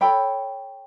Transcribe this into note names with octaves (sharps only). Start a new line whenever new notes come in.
A4 C#5 G5 B5